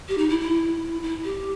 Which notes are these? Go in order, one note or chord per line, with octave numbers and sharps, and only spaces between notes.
G4
D#4
E4
E4
E4
G4